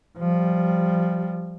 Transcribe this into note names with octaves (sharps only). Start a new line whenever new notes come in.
F3 G3